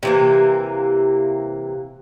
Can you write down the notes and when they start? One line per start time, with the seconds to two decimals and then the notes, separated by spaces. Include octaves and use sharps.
0.03 C3 E3 A#3